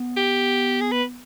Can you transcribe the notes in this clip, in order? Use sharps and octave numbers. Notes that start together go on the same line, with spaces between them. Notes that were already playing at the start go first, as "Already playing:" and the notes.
Already playing: B3
G4
G#4
B4